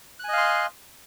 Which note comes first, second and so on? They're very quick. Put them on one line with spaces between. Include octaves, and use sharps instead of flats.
F#6 G#5 D#5 F5 C6